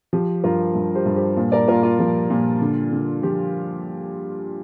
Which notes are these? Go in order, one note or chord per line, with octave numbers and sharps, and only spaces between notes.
F3 G4
G2 F4 A#4
G2
G4 C5
G2
G4 C5
A#2
A#4 D5
A#2 F4 A#4
F4
F3
A#2
D3
D3
F3 G4